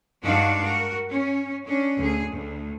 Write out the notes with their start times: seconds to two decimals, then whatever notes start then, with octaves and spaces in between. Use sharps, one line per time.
0.22 G2 G#3 D4 D#4 F#4 F5
0.65 F#4 A#4
1.10 C#4
1.66 C#4 D4
1.98 D2 G#4
2.32 D2